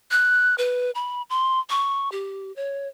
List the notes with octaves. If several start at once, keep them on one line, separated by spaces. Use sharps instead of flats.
F#6
B4
B5
C6
C#6
G4
C#5